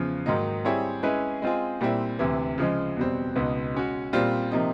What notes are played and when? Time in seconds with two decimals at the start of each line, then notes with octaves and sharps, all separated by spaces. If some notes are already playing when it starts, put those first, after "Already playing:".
Already playing: E2 C#3 F3
0.26 G#2 D#3 F#3 A#3 D#4
0.65 G3 C4 E4 G#4 C#5
1.03 G#3 C#4 E4 G#4 B4
1.42 G#3 C4 F4 G#4
1.81 A#2 G3 C4 E4
2.19 D2 C3 E3
2.58 C#3 F3 G#3
2.96 E2 B2 G3 C4
3.35 C#2 B2 G#3 B3 D#4
3.75 G#3 C#4 F#4
4.13 A#2 G3 C4 F4
4.51 C3 F3 A#3 D#4